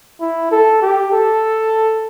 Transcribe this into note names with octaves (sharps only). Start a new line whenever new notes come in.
E4
A4
G4
A4